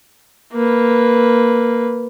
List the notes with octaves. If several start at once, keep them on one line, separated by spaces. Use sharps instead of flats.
A#3 B4